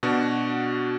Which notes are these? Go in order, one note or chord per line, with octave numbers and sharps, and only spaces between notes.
B2 D4 F#4